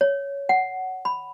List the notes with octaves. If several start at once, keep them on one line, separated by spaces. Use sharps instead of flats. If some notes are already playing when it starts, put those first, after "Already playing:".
C#5
F#5
B5